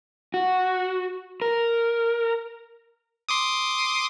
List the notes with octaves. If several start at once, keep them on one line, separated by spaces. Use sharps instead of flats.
F#4
A#4
C6 D6 D#6